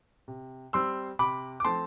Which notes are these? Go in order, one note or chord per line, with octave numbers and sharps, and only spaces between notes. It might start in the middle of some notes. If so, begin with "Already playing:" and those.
C3
G3 C4 C6 E6
C3 B5 D6
D6
F3 A3 C4 A5 C6